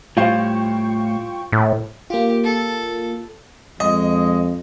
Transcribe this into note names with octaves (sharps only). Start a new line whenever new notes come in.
A2 G3 F4 C5 F5 G5 C#6
A2
A#3 F4 G4
A4
F2 G#3 D#5